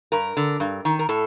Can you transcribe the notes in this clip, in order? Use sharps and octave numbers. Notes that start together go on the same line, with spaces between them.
G2 A#4
D3
G2
D#3
A#4
A2 A4